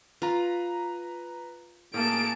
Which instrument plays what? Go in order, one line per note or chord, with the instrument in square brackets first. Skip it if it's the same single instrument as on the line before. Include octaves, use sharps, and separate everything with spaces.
[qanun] F4 [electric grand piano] B4 A#5
[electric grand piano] A2 [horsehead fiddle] A#3 G#4 [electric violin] A5 D7